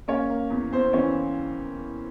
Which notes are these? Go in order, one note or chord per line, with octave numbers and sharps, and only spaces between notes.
A#3 C#4 C#5
A#3
E2
E2 C4 C5
E3 C#4 C#5